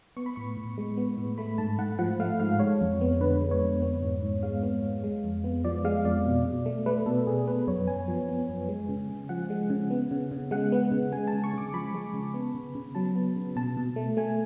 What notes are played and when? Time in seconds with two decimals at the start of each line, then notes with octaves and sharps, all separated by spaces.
0.17 B3 C#6
0.26 B5
0.36 A2 C#6
0.57 A2
0.78 G#3
0.97 B3
1.17 A2
1.38 A3 B5
1.58 G#2 A5
1.78 G#2 F#5
1.99 F3 F#5
2.19 A3 F5
2.40 G#2 F5
2.60 G#3 C#5
2.81 F2
3.01 B3
3.21 D3 B4
3.41 G#3
3.51 C#5
3.61 F2
3.82 B3
4.03 G#2
4.22 G#2
4.43 G#3 F5
4.63 B3
4.83 G#2
5.04 G#3
5.24 F2
5.44 B3
5.65 F3 D5
5.85 G#3 F5
6.04 F2 D5
6.25 B2
6.45 B2
6.66 A3
6.86 A3 B4
7.06 B2 A4
7.27 B2 G#4
7.47 B3 B4
7.67 F#2 C#5
7.87 F#2 G#5
8.08 F3
8.29 B3
8.49 F#2
8.69 G#3
8.89 C#3
9.09 C#3
9.29 F3 F#5
9.50 G#3
9.70 C#3
9.90 B3
10.11 C#3
10.31 C#3
10.51 G#3 F#5
10.72 B3
10.92 C#3
11.12 G#3 G#5
11.28 A5
11.33 C#3
11.44 C#6
11.53 C#3 D6
11.74 F3 B5
11.94 G#3
12.14 C#3
12.34 B3
12.54 C#3
12.75 C#3
12.95 F#3 A5
13.15 B3
13.36 C#3
13.56 B2 A5
13.77 B2
13.96 A3
14.17 A3 G#5